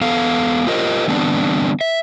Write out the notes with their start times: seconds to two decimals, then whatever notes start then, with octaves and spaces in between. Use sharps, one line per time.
0.01 E2 B3 A4 F5
0.67 F4 G4 A#4 C5 D#5
1.08 D3 E3 G3 B3 C4 D4
1.81 E5